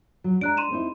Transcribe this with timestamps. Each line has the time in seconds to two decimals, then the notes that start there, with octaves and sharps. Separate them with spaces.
0.24 F#3
0.41 G#3 D4 A#5 F#6 D7
0.57 C6 D#7 E7
0.71 C4 D#4 E4